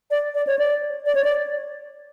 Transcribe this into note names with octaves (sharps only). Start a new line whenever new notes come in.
D5
D5
C#5
D5
D5
C#5
D5